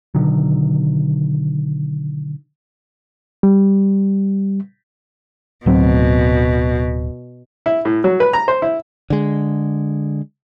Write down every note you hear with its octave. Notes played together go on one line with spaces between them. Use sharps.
B2 D3 D#3 F#3
G3
D1 B2 F#3 C4
E4
A2
F#3
B4
A#5
C5
E4
D3 G#3